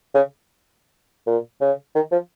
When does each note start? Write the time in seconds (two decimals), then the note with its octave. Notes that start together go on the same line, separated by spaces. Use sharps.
0.14 C#3
1.27 A#2
1.61 C#3
1.95 D#3
2.12 F3